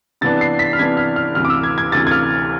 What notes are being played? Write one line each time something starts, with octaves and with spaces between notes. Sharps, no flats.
C3 E3 B3 D4 A6
C7
B6
F6
C3 E3 B3 D4 G#6
F6
F6
D2 C3 E3 F6
D6
E6
G#6
G#6
D2 C3 E3 A6
G#6
F6